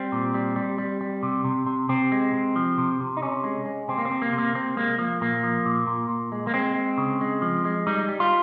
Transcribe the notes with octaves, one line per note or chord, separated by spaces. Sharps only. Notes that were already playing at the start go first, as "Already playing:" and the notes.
Already playing: G3 C4
A#2
G3
G3
G3
G3
C3
C3
C3
C3 C4
G#3
C3
F3
C3
C3
D#4
C3 C#4
G#3
G#3
C3 C4
A#3
C4
C3
A#3
C3
A#3
C3 C4
G#3 A#3
F3 A#3
A#2 A#3
F3
A#2
A#2
A#2
G#3
A#3
G#3 C4
G#3
C#3
G#3
F3
G#3
G3 D#4
G3
F4